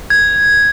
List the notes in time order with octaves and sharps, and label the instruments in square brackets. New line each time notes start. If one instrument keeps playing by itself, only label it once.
[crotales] G#6